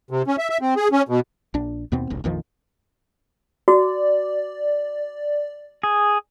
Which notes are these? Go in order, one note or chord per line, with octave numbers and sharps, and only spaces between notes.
C3
C#4
E5
E5
C4
G#4
C#4
B2
A#1 D4
D#2 B2 B3 C4
E1 B1
A#1 F2 D#3 F3
F#4 D5
G#4